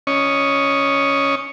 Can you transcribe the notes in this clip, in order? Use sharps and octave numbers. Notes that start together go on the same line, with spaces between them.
C#4 C#5 D#5